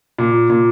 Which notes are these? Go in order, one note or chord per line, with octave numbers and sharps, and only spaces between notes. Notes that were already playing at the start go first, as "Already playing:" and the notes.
A#2
A#2